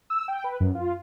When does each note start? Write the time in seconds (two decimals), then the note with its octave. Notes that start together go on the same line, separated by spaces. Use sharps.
0.10 E6
0.28 G5
0.44 B4
0.60 F#2
0.75 F4